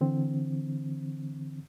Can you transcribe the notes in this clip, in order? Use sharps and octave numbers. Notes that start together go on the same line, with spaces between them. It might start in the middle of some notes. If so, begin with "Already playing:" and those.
D3 E3 C4